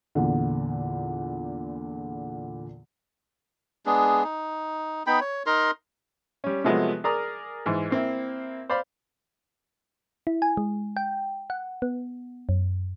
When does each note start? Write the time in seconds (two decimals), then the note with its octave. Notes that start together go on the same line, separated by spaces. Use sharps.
0.15 E2 A#2 D3
3.86 G#3 B3 D4 G#4
4.24 D#4
5.07 B3 D#4 G5 B5
5.21 C#5
5.46 D#4 A#4 A#5 C6
6.44 G3 C#4
6.64 C3 F3 F#3 G#3 A3 B3
7.04 G#4 A#4 D5 A#5 D#6 F6
7.66 G#2 E3
7.90 A#3 C4 E4
8.69 C5 D5 F5 B5
10.27 E4
10.42 G#5
10.57 G#3
10.97 G5
11.50 F#5
11.82 B3
12.49 F#2